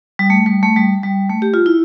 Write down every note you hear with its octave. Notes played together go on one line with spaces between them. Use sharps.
G3
A3
G3
A3
G3
G3
A3
G4
F4
E4